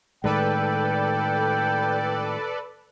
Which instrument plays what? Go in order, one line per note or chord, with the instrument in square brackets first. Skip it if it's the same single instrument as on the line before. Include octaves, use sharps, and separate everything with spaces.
[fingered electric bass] A2 D#3 G#3 [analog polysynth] A4 B4 D5 [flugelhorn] G5